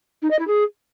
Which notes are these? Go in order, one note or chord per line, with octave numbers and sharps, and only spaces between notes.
D#4
D#5
E4
G#4